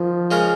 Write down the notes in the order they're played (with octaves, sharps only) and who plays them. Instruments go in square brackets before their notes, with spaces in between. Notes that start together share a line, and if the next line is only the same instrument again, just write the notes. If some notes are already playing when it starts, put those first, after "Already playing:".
Already playing: [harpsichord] D#3 [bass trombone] F3
[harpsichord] C#3 G#3 C#4 A#4